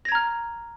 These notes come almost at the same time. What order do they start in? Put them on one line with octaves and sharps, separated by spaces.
A#6 G#6 A#5 F6